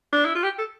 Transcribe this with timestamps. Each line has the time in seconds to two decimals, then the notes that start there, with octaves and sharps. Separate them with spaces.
0.13 D4
0.25 E4
0.35 F4
0.43 G4
0.59 A4